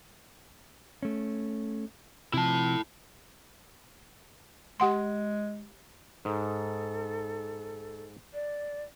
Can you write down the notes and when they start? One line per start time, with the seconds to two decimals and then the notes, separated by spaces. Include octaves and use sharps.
1.03 A3 C#4
2.33 C3 F3 E4 A5
4.80 G#3 G4 F#5 C6
6.25 G#2 A4
8.34 D5